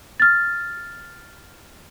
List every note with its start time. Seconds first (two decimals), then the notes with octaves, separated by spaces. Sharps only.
0.20 F6 A6